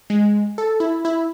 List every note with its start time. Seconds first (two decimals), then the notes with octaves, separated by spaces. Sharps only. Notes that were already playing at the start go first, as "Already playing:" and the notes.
0.10 G#3
0.58 A4
0.80 E4
1.05 E4